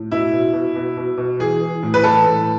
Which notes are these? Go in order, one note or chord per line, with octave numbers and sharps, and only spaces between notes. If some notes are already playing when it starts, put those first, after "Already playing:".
Already playing: A2
B2 E4
B2
B2
B2
B2
B2
E3 G#4
E3
A2
B4
E3 A4
A2